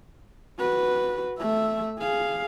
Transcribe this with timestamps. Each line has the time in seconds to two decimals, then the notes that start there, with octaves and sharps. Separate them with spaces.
0.59 F#4 B4
1.39 A3 E5
1.99 G#4 F5